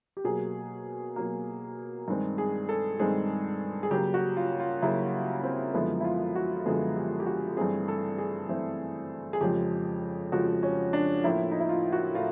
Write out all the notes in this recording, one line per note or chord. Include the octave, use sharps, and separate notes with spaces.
G4
B2 F#3 A#3 G#4
B2 F#3 A#3
G2 D#3 G#3 C4
G#4
A4
G2 D#3 G#3 C4 G#4
G#4
C#3 F#3 A#3 G4
F#4
F4
F4
C#3 F#3 A#3 E4
C4
F#2 D3 F3 G#3 B3 E4
E4
F4
F#4
F#2 D3 F3 G#3 B3 G#4
G4
G4
F#4
G2 E3 A3 C4 G#4
A4
G#4
G2 E3 A3 C4
G#4
F2 C#3 F3 G#3 G4
F2 C#3 F3 G#3 F#4
C#4
D4
A2 F3 A#3 E4
D#4
E4
F4
F#4
A2 F4